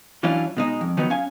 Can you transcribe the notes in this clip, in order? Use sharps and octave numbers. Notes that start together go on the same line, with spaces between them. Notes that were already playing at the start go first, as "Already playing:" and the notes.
E3 F#3 C#4 D4 E4 F4
B2 G#3 D#4
F2
D#3 F3 F#3 B3 D#4
C#4 F5 G#5